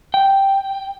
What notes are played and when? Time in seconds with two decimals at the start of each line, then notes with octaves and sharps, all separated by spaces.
0.14 G5